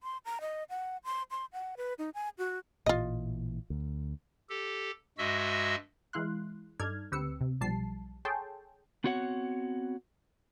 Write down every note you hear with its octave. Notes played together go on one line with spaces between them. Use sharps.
C6
A#5
D#5
F#5
C6
C6
F#5
B4
D#4
G#5
F#4
A1 A#2 E3 F4 D#5
D2
G4 A4
G2 G#3 F#4 D#5 E5 E6
E3 G#3 E4 F5 C6 F#6
G2 D#4 A4 D5 F6 G#6
D2 C4 G4 B4 E6 C#7
C3
B1 F3 G3 A5 C7
G#4 A4 C#5 G5 A5 C6
B3 C4 F#4 C#5 F#5